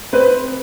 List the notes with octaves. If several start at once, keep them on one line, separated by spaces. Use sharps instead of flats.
C4 B4